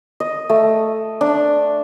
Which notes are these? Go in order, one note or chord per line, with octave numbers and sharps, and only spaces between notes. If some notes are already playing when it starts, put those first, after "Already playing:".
D#5
A3
D4